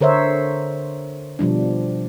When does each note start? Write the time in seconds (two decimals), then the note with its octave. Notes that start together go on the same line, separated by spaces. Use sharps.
0.01 D3 A#4 C5 C#5 E5
1.39 B2 F3 G3 D4